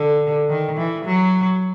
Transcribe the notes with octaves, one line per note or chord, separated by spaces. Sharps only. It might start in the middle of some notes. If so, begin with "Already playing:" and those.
Already playing: D3
D#3
E3
F#3